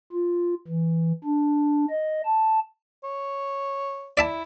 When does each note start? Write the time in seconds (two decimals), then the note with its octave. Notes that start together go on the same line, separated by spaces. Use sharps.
0.13 F4
0.68 E3
1.24 D4
1.90 D#5
2.26 A5
3.04 C#5
4.17 E4 D5 E5 A5